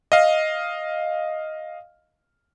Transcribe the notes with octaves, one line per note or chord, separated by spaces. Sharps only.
D#5 F5